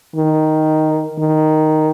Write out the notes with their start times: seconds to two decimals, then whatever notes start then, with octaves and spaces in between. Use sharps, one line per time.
0.16 D#3
1.19 D#3